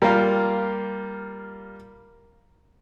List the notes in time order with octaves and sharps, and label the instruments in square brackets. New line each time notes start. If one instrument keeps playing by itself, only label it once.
[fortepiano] G3 A#3 F4 [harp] A#4